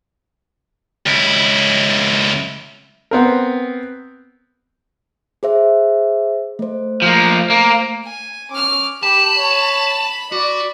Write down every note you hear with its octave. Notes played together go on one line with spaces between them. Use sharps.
C#2 E4
B3 C4 A#4
G#4 C5 E5
A3 C5
F3 A#3
A#3
G#5
C#4 D6 F6
G4 A5 B5
C#5
F#4 D5